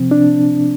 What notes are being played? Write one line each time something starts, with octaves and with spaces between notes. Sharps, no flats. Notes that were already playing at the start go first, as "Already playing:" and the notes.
Already playing: C3 F3 C4
D4